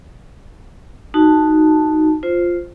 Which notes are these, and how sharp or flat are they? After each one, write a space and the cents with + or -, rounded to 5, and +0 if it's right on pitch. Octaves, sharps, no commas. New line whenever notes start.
D#4 +0 F#4 +0 A5 +0
F4 +0 C5 +0